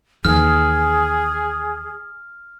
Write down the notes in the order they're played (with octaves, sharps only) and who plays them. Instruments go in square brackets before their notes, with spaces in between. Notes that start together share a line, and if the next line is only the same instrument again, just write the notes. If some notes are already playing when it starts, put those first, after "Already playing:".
[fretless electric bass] D#2 E3 [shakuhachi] G#4 [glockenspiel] F6